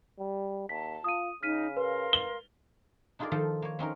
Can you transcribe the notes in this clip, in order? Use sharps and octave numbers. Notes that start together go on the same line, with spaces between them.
G3
D#2 A5 B6
F4 D#6 D#7
C#3 D#4 F6 B6 D#7
A#4 B4 F5 C6
G7
D4 D#4 F4 G#4 A#4 D5
D#3 F3 D#4 A4 F5
A#3 C#5
C4 C#4 D#4 A#4